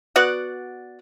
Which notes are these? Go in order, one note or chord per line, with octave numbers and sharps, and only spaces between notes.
B3 F#4 D5 F#5